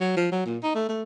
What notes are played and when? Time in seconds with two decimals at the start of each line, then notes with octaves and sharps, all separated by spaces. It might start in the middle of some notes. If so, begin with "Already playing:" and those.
0.01 F#3
0.17 F3
0.32 F#3
0.46 A#2
0.63 D#4
0.75 A3
0.89 A3